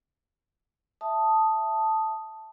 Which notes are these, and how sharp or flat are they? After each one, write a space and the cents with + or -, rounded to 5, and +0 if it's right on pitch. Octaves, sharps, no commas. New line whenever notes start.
E5 +0 A5 +0 D#6 +0